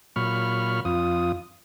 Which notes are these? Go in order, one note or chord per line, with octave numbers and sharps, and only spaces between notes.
A#2 F#3 B5 C#6 F6
F2 F4 D#6